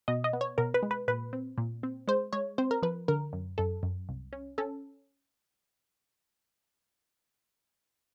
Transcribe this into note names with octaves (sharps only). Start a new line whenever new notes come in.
B2 D#5
D#5
B3
C#5
B2 A#4
B4
G#3
B4
A#2 B4
C4
A#2
C4
G#3 C5
G#3 C#5
C4 C5
A#4
F3 B4
D3 A#4
F#2
F#2 A4
F#2
C2
C#4
C#4 A4